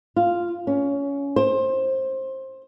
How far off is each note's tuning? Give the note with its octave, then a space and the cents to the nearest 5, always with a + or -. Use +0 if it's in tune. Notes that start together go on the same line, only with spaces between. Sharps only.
F4 -5
C#4 +20
C5 +20